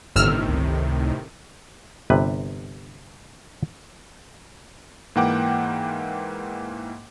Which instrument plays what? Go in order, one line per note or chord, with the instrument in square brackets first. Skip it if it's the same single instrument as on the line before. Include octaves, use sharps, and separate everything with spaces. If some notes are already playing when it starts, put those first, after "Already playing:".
[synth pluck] G1 E6 F6 [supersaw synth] A2 C3 D#3
[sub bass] C#2
[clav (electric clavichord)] G1 C3 B4
[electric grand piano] G#2 E3 A#3 F#5 G5 D6